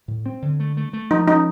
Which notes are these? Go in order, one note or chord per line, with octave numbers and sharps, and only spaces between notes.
A2
C4
D3
A3
A3
A3
F3 D#4
C#4 D#4